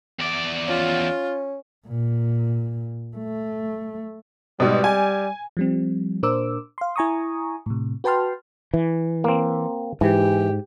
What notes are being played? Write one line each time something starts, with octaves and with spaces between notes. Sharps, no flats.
E2 D5
C#4 F4
A#2
A3
G#2 B2 G3
G#5
F3 G3 C4
A#2 D4 A#4 C5 D6 E6
F5 C6
E4 G#5 A#5 C#6 D#6
A2 C3
F#4 B4 G5 A5 C6 F6
E3
A#3 C4
G#2 E3 G4